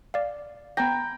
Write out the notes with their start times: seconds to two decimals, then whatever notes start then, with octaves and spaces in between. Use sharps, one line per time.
0.14 D5 F5
0.77 B3 G5 A#5 B5 A#6